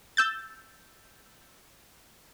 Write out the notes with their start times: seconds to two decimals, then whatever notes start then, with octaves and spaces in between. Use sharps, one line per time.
0.17 E6 G6 A6